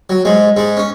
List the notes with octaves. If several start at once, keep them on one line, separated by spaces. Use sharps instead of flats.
F#3
G#2 G#3
G#2 G#3
C#4